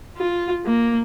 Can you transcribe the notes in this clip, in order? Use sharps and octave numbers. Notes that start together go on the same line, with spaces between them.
F4
A#3